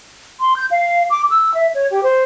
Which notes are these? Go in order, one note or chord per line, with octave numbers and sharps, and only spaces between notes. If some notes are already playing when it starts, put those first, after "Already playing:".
C6
G6
F5
D6
E6
E5
C#5
G4
C5